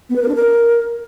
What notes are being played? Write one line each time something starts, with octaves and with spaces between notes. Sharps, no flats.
B3
B4
A#4
D4
A#4